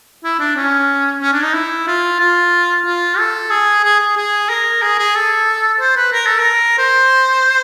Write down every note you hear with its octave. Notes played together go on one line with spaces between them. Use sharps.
E4
D4
C#4
C#4
D4
D#4
E4
F4
F4
F4
A4
G#4
G#4
G#4
G#4
A#4
G#4
G#4
A4
C5
B4
A#4
A4
A#4
C5